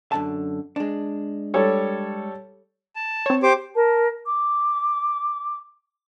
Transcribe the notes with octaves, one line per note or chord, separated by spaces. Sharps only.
F#2 D3 A5
G#3 D4
G3 A4 C#5
A5
C4 C#5
G4 C5 D6
A#4 A5
D6